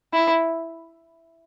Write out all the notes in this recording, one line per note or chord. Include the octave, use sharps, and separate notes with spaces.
E4